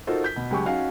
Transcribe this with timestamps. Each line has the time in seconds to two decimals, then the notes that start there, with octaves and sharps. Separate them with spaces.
0.07 D#4 F4 F#4 A4 A#4 C5
0.24 G6 B6
0.36 B2
0.50 C#2 F#3 G4 G#5 C#6
0.65 C#4 D#4 F#4 F5 G#5